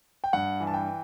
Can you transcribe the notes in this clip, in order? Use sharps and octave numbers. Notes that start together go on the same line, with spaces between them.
G5
G2 F#5
E3
A5
G5